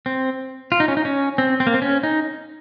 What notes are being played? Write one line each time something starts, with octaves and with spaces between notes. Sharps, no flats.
C4
F4
D#4
C#4
D#4
C#4
C4
C4
A#3
C4
C#4
D#4